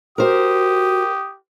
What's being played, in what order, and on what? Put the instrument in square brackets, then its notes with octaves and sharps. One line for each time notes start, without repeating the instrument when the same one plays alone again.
[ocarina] F#4 [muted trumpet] G4 [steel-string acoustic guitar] A#4 C5 [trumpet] D#6